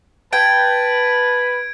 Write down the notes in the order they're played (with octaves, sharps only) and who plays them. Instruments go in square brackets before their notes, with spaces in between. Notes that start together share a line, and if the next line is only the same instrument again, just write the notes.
[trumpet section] B4 [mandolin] G5 [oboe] A5 [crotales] G#6 D7